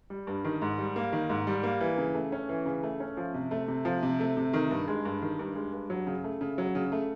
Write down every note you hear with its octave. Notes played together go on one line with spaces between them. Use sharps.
G3
G2
D#3
G#2
G3
A#3
D#3
G#2
G3
A#3
E3
C#3
A3
C#4
E3
C#3
A3
C#4
F3
C3
A3
C3
F3
C3
A3
C3
D#3
G2
G#3
G2
D#3
G2
G#3
G2
F#3
C#3
A3
C#3
F#3
C#3
A3